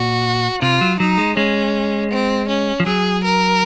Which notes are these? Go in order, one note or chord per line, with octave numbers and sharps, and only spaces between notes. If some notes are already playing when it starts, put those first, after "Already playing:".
Already playing: A#2 F#4
C3 F4
F#3
F#3 D#4
G#3
G#3 C#4
C4
C#4
F3
F#3 G#4
A#4